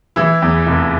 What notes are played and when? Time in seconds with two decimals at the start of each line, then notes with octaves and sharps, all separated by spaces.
0.16 E3 E4
0.42 E2
0.66 F1